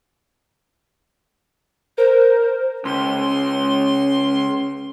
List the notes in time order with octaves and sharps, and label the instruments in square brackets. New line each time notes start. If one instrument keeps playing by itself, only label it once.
[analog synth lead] A#4 [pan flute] C5
[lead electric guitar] C#2 [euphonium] C#4 [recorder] C6